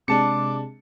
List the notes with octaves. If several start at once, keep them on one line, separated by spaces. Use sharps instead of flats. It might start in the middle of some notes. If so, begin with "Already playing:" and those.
C3 G#3 D4 A5 D6 C#7